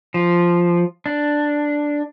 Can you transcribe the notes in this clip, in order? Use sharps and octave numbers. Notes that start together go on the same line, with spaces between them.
F3
D4